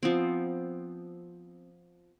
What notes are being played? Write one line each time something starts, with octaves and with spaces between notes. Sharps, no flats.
F3 B3 C4